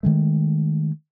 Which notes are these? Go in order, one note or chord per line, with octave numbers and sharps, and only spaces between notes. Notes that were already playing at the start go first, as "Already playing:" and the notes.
D#3 G#3 A3